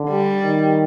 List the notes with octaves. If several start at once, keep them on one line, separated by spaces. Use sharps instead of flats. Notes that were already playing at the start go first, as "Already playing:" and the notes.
Already playing: D3
G3
D#3